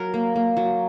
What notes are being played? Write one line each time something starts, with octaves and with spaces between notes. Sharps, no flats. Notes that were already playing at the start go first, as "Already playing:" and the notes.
Already playing: F#3 A#4
A#3
A#3
F#3